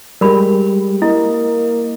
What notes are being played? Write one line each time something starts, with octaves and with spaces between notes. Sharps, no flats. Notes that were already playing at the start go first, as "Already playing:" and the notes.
G3 G#3 G4 A#4 B5
A#3 E4 D#5